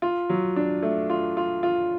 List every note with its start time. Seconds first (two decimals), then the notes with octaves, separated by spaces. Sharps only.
0.02 F4
0.29 F#3
0.56 D4
0.82 A3
1.10 F4
1.37 F4
1.63 F4